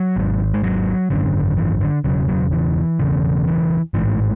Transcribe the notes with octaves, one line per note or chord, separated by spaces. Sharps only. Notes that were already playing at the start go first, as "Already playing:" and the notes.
Already playing: F#3
G#1 G#2
G#3
F#3
G#1 F#2 D3
E3
D3
E1 D2 C#3 F#3
F#3
E3
E1 E2 C#3
E3
A1 G#2 E3